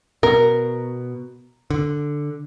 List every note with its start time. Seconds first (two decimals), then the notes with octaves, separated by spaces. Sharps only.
0.23 B2 A#4
1.70 D3